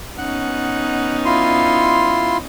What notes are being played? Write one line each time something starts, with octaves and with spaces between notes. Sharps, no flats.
B3 C#4 D#4 F#5
E4 F4 C6